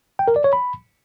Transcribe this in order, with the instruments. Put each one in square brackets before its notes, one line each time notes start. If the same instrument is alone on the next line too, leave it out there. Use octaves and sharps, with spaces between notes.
[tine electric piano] G5
A#4
D5
C#5
B5